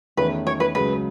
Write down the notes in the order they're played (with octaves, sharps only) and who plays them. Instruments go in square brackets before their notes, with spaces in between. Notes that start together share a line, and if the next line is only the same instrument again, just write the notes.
[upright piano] E2 D#3 A3 C#4 [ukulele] B4
[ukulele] C#5
B4
[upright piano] C#2 C#3 F#3 [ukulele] B4